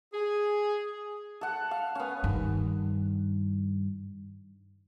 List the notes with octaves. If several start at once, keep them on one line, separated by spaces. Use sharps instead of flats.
G#4
A4 F#5
F5
B3 C#4
G2 D#3